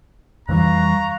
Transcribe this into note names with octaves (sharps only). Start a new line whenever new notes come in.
F2 E3 G3 F5 A#5 C#6 F#6